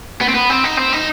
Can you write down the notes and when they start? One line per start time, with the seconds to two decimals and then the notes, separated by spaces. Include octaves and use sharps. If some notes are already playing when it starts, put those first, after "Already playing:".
0.21 B3
0.28 C4
0.35 B3
0.50 C4
0.64 D#4
0.77 C4
0.93 D#4